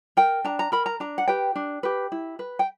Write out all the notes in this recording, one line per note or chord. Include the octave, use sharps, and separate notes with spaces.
A#4 G5
D4 A#5
A#5
A#4 B5
A#5
D4 A#5
F#5
G4 B4 G5
D4
G4 B4
E4
B4
G5